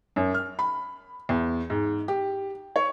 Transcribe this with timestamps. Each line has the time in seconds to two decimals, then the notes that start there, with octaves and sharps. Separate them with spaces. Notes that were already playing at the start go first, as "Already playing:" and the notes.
0.16 F#2
0.34 F6
0.59 B5
1.29 E2
1.70 G#2
2.08 G4
2.76 C#5